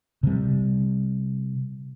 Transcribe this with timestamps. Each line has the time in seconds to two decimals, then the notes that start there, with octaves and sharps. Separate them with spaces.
0.23 C3 G3